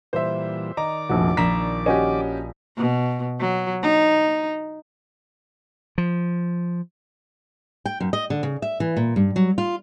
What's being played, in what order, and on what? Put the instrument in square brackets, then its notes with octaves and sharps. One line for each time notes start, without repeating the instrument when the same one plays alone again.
[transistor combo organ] A#2 E3 G3 [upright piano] C5 E5
[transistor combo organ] D#3 D5 D6 [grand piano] D#5 [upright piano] A#5
[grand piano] F1 A#1 F2 [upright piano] F#4
[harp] A#1 E7 [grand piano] A#5 [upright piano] B6
[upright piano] C#4 F#4 G4 [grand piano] D#5 G#5
[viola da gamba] B2
F#3
D#4
[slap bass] F3
[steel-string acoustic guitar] G5
F#2
D#5
D3
C#3
E5
E3
A#2
G2
F#3
F4